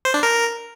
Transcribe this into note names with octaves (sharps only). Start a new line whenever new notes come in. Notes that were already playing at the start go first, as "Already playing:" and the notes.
C5
D4
A#4